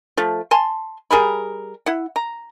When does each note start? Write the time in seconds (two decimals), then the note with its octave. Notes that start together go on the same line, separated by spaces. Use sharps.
0.17 F3 A3
0.51 G#5 A5 C6
1.11 G3 G#4 A#4 B5
1.86 E4 F#5
2.16 A#5